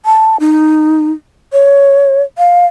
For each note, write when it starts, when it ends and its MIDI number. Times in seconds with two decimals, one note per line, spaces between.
0.05 0.37 81
0.40 1.12 63
1.53 2.22 73
2.38 2.66 77